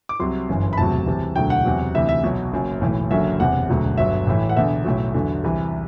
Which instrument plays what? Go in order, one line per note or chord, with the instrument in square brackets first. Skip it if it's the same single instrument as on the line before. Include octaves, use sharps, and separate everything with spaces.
[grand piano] D6
C2 C3 F#3 C6
G1 F#2 E3
B5
E1 D2 C3 F#3 A5
C2 C3 E3
E1 D2 D3 F#3 G5
F#5
E2 C3 F#3
D2 C3 E3 E5
E5
B1 B2 F#3
F#1 F#2 F#3
B1 A2 E3
F#1 F#2 D3 F#3 E5
E1 E2 C3 F#5
E1 D2 D3 F#3
G1 G2 F#3 E5
A1 A2 E3
F#5
E1 E2 D3 E5
B1 A2 F#3
E2 D3 F#3
C2 C3 E3